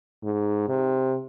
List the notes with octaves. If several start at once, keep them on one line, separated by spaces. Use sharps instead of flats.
G#2
C3